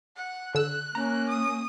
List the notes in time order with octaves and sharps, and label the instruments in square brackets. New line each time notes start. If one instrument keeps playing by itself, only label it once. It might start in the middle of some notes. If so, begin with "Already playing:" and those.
[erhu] F#5
[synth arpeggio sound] D3 E6 [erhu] F#6
[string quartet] A#3 [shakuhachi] C#4 [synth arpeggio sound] A#5
[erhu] D#6